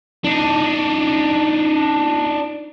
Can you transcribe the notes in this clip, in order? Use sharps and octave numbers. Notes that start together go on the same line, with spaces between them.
D4 D#4